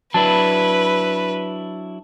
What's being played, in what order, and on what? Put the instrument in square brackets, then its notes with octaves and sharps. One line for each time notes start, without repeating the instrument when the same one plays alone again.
[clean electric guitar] F#3 D4 E4 [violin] B4 [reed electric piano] A5